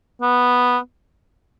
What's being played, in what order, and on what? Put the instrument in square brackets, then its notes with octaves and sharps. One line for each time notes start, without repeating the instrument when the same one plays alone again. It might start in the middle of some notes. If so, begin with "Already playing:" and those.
[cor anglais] B3